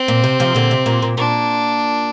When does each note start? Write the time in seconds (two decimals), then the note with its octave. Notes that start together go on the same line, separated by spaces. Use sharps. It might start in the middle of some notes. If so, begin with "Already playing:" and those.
Already playing: C4
0.08 A#2
0.24 C3
0.40 C3 F3
0.54 A#2 D3
0.71 C3
0.86 A#2
1.02 A#2
1.17 A#2 D4